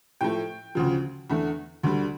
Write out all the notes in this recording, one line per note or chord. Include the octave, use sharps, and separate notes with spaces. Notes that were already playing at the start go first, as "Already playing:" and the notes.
A2 F3 A3 G5
D2 C#3 F3
E2 D3 A3
D2 D3 G3